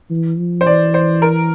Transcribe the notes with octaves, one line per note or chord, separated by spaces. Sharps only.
E3
F3
C5
E3 D5
C5
A#4